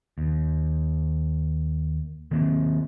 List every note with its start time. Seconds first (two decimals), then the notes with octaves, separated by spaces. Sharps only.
0.18 D#2
2.31 D#3 A#3 C4